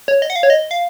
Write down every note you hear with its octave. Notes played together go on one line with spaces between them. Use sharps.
C#5
D#5
F#5
F5
C#5
D#5
F5